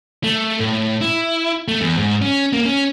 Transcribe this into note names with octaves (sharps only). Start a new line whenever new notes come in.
A3
A2
E4
A3
E2
G#2
C#4
A#3
C#4